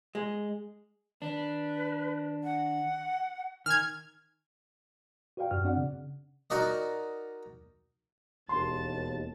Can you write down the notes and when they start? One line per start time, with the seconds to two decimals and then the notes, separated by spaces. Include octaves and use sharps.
0.15 G#3
1.22 D#3 D4 B4
2.43 F#5
3.66 D#3 G#5 F6 G#6
5.37 F#4 B4 D5 F5 G5
5.51 F#2 F#4 F6
5.64 C4 D4 D5 F#5
5.77 C#3
6.50 D#4 F#4 A#4 D5 D#5
8.49 E1 D#2 A5 C6